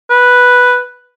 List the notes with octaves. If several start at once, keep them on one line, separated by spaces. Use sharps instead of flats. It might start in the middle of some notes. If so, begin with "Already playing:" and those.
B4